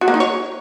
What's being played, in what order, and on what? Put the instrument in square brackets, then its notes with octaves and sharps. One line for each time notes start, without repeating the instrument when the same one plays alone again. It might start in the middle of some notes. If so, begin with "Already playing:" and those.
[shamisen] F#4
A#3
D#4
C#5